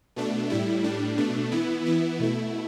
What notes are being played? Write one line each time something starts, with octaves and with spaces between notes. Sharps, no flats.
B2 A3 D4
A2 G3 E4
A2 G3 D4
B2 A3 D4
E3 B3 E4
E3 B3 E4
B2 A3 E4